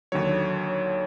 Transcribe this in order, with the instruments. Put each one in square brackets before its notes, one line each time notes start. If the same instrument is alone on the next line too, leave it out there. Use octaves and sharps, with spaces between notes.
[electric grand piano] D#2 D3 F#3 C#5